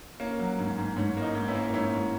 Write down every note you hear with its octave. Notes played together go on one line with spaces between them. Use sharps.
A#3 C#4
F#3
G#2
G#2
G#2 C#4
A#3
D#4
G#2
C#4 E4
A#3
G#2 C#4 E4
G#2